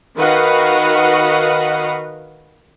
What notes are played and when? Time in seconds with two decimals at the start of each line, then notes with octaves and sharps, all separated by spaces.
0.17 D#3 F#4 B4 D#5 F5 F#5